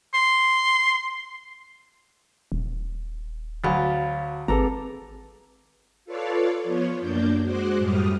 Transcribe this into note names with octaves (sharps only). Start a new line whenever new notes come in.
C6
D#1
D2 F#3 F5 B5 A6
G#1 C4 G#4 A4 B4 A#5
F4 A4 B4 C#5 D5 F5
F3 B3 F4 C#5
F#2 A#3 D4 D5 G6
G#3 F#4 C5 D6 F#6
F#2 A2 G3 D#6 F6